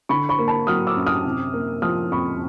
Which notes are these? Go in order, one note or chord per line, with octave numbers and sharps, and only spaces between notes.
D3 B5 C#6
B5 C#6
A#3
A5 B5
F#3 D#6 F6
D6 E6
F#2
D#6 F6
C3
A#3
F3 D#6 F6
F2 B5 C#6